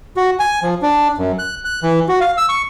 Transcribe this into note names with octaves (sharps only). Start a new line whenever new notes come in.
F#4
G#5
F3
D4
F#2
F#6
F#6
E3
F#4
F5
E6
C#6